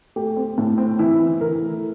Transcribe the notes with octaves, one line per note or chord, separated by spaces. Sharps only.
A3 G4
C4
A2
C4
E3 E4
E3
E3 A#4
A3